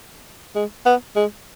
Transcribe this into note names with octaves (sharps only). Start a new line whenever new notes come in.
G#3
B3
G#3